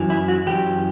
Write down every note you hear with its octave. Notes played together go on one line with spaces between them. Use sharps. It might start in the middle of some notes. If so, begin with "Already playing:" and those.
Already playing: F#2 E3
E4
F#4
F#2 E3 G4